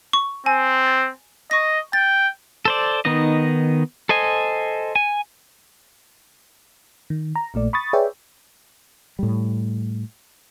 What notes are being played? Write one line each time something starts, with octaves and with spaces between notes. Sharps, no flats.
C#6
C4 G#5
A6
D#5 C#6 A#6
G5 A6
A4 C5 D5
D#3 B3 D#4 D#5
A4 C5 D#5 G#5
G#5
D#3
A#5
A#1 A#2 A3 D5
B5 C#6 D#6 A6
G#4 B4 C#5 D5 E5 G5
A2 G3